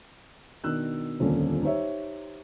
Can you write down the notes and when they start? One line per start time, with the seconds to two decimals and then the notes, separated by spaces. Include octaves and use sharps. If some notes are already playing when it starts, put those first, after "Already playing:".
0.64 B2 D#3 D4 E6 F#6
1.20 D#1 F2 D3 A#3 C#4
1.62 D#4 G4 C5 C#5 E5